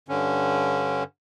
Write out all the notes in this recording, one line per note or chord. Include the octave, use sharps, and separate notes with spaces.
G2 D3 C#4